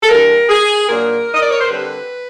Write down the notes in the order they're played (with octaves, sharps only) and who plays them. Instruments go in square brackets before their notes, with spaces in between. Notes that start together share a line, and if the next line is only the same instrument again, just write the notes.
[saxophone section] A4
G2 E3 G3 A#3 A#4
G#4
A#2 F#3 A#3 D4 A#4
D#5
D5
C#5
C5
D3 G3 C4 B4